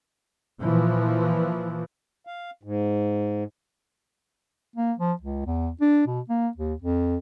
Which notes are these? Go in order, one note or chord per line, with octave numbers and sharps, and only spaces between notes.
A#2 E3 F3
F5
G#2
A#3
F3
C#2
E2
D4
B2
A#3
D#2
F2